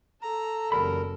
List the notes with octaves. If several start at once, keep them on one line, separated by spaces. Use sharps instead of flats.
A4 A#5
F#1 E2 G3 A#4 B5